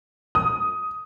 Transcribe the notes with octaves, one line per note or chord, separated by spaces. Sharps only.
D#6